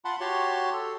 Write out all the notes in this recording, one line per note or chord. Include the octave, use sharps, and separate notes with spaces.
F4 F#5 A5 B5 C6
F#4 G4 C#5 A5 C6
A4